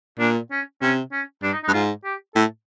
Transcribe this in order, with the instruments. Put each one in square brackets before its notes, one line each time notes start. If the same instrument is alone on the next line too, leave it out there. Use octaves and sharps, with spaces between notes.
[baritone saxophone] A#2 [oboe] D4
[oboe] C#4
[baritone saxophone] C3 [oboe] C#4
[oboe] C#4
[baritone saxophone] G2 [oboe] D4
[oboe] D#4
D#4
[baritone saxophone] G2
[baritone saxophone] G#2 [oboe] F4
[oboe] G4
[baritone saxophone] A2 [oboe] A4